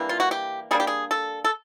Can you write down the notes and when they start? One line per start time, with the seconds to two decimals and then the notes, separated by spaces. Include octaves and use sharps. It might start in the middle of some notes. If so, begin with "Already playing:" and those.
Already playing: E3 G3 A#3 D4
0.09 F4
0.20 F#4
0.31 G4
0.71 E3 G3 A#3 D4 G#4
0.80 G4
0.87 G#4
1.11 A4
1.45 A4